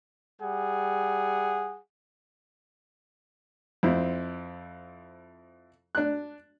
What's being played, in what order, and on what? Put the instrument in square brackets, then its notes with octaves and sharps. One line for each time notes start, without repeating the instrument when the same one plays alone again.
[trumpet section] G3 G#4 F#5
[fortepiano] F2 C4 E4
D4 F#6